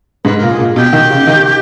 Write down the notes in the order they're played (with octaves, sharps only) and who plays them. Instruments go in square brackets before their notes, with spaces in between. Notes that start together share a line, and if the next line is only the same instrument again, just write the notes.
[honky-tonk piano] G#2 [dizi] B4
[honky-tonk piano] A#2 [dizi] A#4
[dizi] G#4
[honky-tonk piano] A#2
[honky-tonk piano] B2 [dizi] G4
[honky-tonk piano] D#3
C#3
D#3